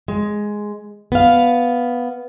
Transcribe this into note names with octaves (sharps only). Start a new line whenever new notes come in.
G#3
B3 F5